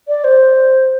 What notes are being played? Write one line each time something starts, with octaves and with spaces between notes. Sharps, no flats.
D5
C5